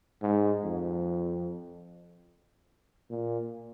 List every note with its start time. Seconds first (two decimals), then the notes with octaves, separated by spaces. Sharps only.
0.22 G#2
0.64 F2
3.11 A#2